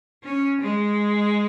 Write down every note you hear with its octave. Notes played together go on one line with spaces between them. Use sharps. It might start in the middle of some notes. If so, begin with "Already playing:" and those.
C#4
G#3